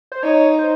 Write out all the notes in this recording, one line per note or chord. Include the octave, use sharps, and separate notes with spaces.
C5
D#4 C#5
C5